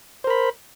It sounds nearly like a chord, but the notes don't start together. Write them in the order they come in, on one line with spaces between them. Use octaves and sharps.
C5 A#4 B5